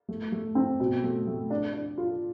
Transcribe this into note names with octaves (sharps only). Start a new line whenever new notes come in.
A3
A3
C4
B2
A3
A3
D4
D4
F4